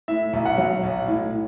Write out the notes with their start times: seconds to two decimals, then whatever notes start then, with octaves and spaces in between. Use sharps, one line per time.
0.08 A2 E5
0.33 B1
0.45 F#5
0.58 F#3
0.83 B1
1.08 A2